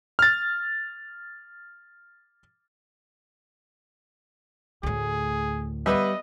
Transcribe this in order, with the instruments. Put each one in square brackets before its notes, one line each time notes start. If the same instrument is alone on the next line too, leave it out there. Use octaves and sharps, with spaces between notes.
[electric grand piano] F6 A6
[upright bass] D2 A2 [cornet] G#4
[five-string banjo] G3 [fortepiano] B3 B4 E5 [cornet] D#5